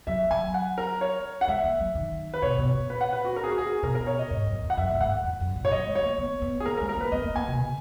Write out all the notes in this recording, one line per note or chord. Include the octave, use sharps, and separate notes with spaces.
F#3 E5
F#3 G#5
F#5
A#4
C#5
F#5
G#3 E5
A#3
F#3
D#3
B4
B2 C#5
B2
A#2
B4
F#5
B4
F#4
A#4
G#4
F#4
G#4
B2 A#4
A#4
C#5
D#5
G#2
F#2
E2
F#5
F#2 E5
A#2
G#2 F#5
F#2
E2
F#2
A#2
C#5
F#3 D#5
G#3
C#5
A#3
B3
B3
G#4
A#3 A#4
A#4
G#3
A#4
A#3 B4
B3 D#5
A#3
A#3 G#5
B2
C#3